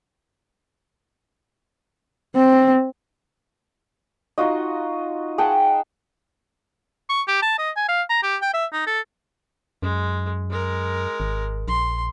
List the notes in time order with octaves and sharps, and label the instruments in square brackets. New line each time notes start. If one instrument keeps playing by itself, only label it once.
[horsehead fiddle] C4
[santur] D#4 F4 F#4 D#5
G#4 F#5 G5 A5
[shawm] C#6
G4
A5
D#5
G#5
F5
A#5
G4
G5
E5
D#4
A4
[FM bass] F#2 [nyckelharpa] G#3
[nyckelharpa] G#3 A#4
[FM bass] G#1
[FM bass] A#1 [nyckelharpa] C6